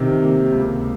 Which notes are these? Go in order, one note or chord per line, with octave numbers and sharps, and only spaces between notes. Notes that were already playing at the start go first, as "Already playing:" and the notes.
Already playing: C3 D#3
A#3
C#2